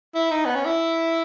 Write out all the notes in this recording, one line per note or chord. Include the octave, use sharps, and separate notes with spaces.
E4
D#4
B3
C#4
E4